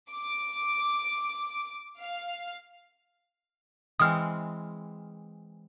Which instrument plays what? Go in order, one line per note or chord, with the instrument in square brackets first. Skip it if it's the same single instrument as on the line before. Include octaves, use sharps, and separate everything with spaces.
[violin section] D6
F5
[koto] E3 G#3 C4 [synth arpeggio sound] D#6 F6